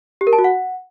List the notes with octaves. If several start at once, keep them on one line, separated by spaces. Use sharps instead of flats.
G4
A#4
A5
F#4
F#5